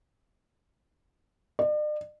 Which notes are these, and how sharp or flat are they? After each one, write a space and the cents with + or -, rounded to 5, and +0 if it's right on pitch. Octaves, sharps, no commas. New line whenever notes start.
D5 +45